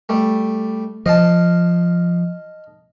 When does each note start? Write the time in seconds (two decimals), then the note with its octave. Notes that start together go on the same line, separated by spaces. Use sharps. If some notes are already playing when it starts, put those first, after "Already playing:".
0.09 G3 A3
1.06 F3 D#5 F5 A5